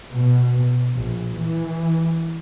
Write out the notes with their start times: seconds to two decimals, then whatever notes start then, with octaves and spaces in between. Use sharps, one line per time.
0.12 B2
0.96 A#1
1.36 E3